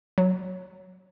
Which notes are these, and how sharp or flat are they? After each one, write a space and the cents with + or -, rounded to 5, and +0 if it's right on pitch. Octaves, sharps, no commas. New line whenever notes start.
F#3 +0 C#5 +0